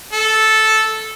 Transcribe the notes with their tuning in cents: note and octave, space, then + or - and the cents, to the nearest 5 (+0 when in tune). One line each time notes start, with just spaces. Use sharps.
A4 -5